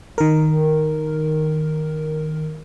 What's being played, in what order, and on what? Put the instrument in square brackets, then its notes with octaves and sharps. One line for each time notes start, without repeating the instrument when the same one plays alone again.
[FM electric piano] D#3 A#4